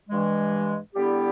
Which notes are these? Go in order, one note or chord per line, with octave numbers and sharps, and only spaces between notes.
G2 E3 G#3
D3 G3 B3 E4 G4